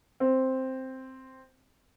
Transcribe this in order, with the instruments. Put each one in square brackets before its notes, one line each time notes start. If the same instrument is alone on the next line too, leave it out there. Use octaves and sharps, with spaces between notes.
[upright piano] C4